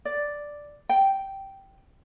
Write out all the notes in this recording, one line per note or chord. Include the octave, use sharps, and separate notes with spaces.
D5
G5